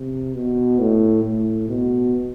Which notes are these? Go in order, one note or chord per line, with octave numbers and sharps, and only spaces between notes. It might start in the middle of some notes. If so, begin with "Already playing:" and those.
Already playing: C3
B2
A2
A2
B2